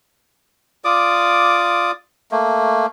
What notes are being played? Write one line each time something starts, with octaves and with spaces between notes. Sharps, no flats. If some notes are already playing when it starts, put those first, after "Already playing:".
F4 D5 D6 D#6
A3 A#3